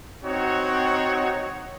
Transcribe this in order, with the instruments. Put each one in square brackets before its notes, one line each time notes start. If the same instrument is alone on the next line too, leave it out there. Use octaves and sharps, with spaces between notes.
[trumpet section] C4 D#4 F#4 C#5 F#5